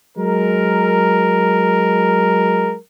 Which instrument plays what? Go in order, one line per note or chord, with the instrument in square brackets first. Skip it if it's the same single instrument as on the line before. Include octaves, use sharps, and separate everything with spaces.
[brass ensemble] F#3 G#3 A#4